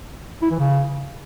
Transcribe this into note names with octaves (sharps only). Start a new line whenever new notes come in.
E4
E3
C#3